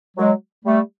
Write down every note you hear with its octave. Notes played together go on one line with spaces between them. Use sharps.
F#3 G#3
G3 A3